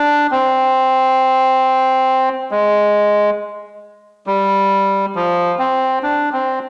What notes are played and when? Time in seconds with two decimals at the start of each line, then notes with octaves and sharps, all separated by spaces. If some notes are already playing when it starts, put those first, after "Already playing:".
Already playing: D4
0.31 C4
2.51 G#3
4.27 G3
5.15 F3
5.59 C4
6.03 D4
6.33 C4